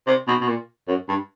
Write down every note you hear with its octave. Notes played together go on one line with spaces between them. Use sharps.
C3
B2
B2
A#2
F#2
G2